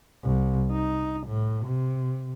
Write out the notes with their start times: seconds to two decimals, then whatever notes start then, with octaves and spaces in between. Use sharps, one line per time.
0.23 C2
0.72 D#4
1.27 A2
1.66 C3